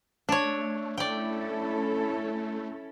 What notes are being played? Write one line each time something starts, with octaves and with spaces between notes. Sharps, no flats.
A3 D4 C#5
C#4 E4 A4 D5 G5